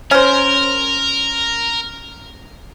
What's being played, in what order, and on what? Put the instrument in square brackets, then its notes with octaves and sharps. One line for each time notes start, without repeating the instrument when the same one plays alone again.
[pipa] C#4 C5 [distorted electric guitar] A#4